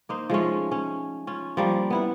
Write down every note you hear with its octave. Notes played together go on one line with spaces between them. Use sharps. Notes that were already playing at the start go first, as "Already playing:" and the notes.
A#3 D#4 C5
F3 G#3 A3 C#4
C#4
C#4 F4
F3 G3 A#3
B3 E4 F#5